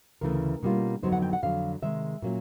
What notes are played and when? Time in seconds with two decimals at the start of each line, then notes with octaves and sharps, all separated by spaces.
0.21 D2 C#3 E3 A3 A#4
0.63 B2 G3 A#3 C#4 F4
1.03 F2 D3 F#3 B3 D#4 C5
1.12 F#5
1.22 G5
1.33 F#5
1.42 F2 D3 F#3 F5
1.82 C3 D#3 G#3 E5
2.22 A#2 F#3 A#3 C#4